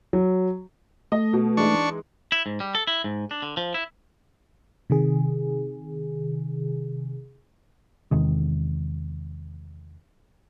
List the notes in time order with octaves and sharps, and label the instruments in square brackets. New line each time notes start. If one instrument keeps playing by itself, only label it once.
[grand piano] F#3
[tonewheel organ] A3 [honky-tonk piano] D#5
[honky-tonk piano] B2
[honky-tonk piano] E3 G#3 D#4 [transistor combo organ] D4 C#6
[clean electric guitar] E4
G#2
G3
A4
E4
G#2
D4
D3
F3
E4
[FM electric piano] C3 D#3 G#4
[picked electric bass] E2 C3 D#3 G#3